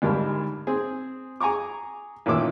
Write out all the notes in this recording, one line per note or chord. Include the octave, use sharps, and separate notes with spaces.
D2 G#2 G3 A#4 A5 B5
C4 G#4
G#4 G#5 A#5 C#6 D6
A1 A#2 D#3 C#5 D6 E6